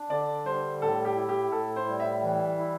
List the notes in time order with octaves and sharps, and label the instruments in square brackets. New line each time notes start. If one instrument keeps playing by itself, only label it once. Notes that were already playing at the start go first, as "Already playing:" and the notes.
Already playing: [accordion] D4
[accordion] D3 [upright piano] D5
[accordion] G3 [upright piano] C5
[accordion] A2 [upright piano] A4
[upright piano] G4
[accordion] E4
[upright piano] G4
[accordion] A2 [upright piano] A4
[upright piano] C5
[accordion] G3
[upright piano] E5
[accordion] E3
E4